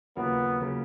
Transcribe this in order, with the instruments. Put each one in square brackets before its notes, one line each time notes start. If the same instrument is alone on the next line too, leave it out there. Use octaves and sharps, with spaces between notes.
[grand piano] D#2 C#3 F#3 A#3 F4 [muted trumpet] B3
[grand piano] C#3 F#3 A#3 F4